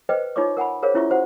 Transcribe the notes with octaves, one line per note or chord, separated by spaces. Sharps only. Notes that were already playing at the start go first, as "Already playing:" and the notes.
A4 B4 C5 D#5 G5
D#4 F4 A4 C#5 C#6 D6
A#4 F#5 G#5 B5
G#4 A#4 C5 C#5 F5
C#4 E4 F4 E5 C#6
F#4 C5 F#5